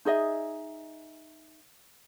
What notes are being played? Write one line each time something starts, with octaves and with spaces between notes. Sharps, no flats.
D#4 G#4 D#5 E5